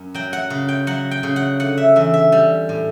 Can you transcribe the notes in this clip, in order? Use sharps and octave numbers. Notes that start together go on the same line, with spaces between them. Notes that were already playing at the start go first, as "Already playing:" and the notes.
Already playing: F#2
F#3 G5
F#5
C#3
G5
F#3 F#5
G5
C#3
F#5
D3 F#5
E5
E2 E5
E5
G3
A2